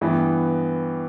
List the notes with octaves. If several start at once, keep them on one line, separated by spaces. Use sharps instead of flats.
G2 E3 B3